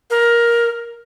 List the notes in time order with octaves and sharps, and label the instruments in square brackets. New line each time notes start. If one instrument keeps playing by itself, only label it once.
[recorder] A#4